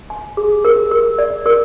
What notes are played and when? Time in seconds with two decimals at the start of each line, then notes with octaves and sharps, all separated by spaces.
0.10 G#5
0.37 G#4
0.65 A#4
0.92 A#4
1.18 D5
1.46 A#4